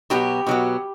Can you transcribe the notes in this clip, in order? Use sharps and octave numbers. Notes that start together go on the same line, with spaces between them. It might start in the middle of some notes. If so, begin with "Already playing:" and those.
B2 F#3 B3 G4
B2 F#3 B3